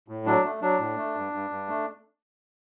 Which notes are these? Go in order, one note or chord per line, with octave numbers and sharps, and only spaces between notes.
A2
F#3 D4
A3
F#3 D4
A2
A3
G2
G2
G2
A3